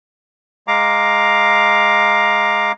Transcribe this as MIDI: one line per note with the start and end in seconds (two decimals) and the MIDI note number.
0.68 2.72 56
0.68 2.72 77
0.68 2.72 82
0.68 2.72 86